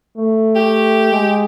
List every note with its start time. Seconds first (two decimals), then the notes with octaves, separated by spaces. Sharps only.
0.17 A3
0.55 G4
1.12 G#3